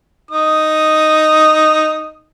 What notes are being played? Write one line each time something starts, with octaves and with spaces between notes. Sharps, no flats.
D#4 D#6